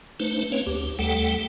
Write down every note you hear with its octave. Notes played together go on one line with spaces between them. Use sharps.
A3 D4 D#4 B4 C5
A#3 C4 C#4 B4 C#5
D2 G4
D#2 G3 A3 A4 F#5 G5